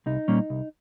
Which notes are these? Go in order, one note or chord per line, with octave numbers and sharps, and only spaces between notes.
C2 D#4
A#2 G3 A#3 C#4
C2